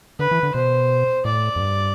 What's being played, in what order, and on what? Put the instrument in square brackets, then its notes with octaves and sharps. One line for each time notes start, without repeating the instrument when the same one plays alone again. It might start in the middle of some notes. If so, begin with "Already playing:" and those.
[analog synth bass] D3 [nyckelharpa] B4
[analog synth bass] E3
D3
[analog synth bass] B2 [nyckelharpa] C5
[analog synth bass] A2 [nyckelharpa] D5
[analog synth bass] F2
G2